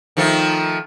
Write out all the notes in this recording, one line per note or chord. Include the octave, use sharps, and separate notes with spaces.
D#3 F3 A3